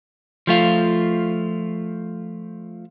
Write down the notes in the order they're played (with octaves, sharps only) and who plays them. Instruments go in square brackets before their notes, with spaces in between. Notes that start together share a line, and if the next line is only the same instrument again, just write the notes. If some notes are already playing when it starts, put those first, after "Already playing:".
[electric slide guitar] F3 A3 F4